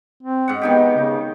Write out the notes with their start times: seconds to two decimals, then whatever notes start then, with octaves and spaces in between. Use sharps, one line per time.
0.23 C4
0.48 G#2 F#5
0.62 D#3 B3 D#4 G4
0.97 C#3